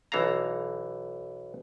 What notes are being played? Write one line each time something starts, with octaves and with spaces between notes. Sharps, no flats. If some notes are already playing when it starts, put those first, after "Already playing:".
B1 E3 A4 F5 A#5